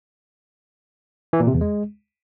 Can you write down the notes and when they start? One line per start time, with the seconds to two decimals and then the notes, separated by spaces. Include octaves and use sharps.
1.33 E3
1.40 A#2
1.47 C3
1.54 E2
1.61 G#3